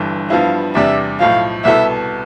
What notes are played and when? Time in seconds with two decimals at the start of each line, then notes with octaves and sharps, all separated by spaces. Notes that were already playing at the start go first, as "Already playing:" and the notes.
Already playing: G1 G2 E3
0.30 G2 F3 B3 E4 F5
0.75 E2 C3 G3 D4 E5
1.20 B1 A2 F3 F5
1.65 C2 B2 B3 E4 A4 E5